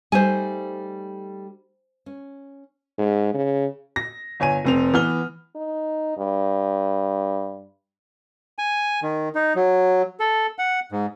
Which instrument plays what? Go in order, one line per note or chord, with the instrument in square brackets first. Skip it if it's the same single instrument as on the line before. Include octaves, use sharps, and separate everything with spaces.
[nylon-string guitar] G3 A3 D#4 [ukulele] C5 G#5
[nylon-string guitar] C#4
[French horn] G#2
C#3
[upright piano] A#6
G1 C#5 G#5 D#7
F1 C4 F7
E3 B3 F6 G7
[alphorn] D#4
G2
[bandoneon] G#5
D#3
D#4
F#3
A4
F#5
G#2